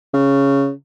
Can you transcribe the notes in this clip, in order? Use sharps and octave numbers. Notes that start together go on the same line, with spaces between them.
C#3